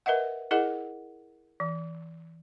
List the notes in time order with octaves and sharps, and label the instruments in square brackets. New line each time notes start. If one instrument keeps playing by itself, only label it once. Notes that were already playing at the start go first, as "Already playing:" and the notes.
[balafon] A#4 B4 D#5 E5 F#5
E4 G#4 A#4 D#5 F#5
E3